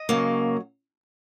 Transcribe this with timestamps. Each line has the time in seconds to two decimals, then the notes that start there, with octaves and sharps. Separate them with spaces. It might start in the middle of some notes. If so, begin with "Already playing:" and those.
Already playing: D#5
0.09 C#3 F#3 A#3